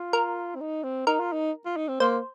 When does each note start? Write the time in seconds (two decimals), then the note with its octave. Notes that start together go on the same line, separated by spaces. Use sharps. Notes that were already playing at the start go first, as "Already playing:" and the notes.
Already playing: F4
0.13 A#4
0.56 C4
0.60 D#4
0.83 C4
1.07 D#4 A#4
1.20 F4
1.33 D#4
1.66 F4
1.77 D#4
1.88 C4
2.00 A#3 C5